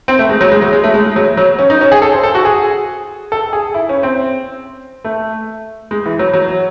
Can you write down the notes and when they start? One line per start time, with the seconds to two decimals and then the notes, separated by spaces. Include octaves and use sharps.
0.08 C4
0.19 A3
0.29 G#3
0.41 F#3
0.52 G#3
0.62 F#3
0.73 G#3
0.84 A3
0.94 G#3
1.05 G#3
1.16 F#3
1.37 F#3
1.59 C#4
1.70 D#4
1.81 C#4
1.92 G#4
2.02 A4
2.13 C5
2.23 A4
2.35 F#4
2.45 G#4
3.32 A4
3.53 G#4
3.74 E4
3.89 C#4
4.03 C4
5.04 A3
5.91 G#3
6.05 E3
6.19 F#3
6.33 F#3